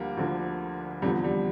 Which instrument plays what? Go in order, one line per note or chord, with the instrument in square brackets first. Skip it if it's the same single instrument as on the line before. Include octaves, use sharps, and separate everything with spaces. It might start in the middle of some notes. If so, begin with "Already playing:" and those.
Already playing: [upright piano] D2 D3 F3 G3 A#3
D2 D3 F3
F1 E2 D3 F3 G3
G3